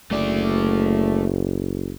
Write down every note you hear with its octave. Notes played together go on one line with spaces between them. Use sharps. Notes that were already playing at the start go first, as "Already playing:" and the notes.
F#1 A3 D5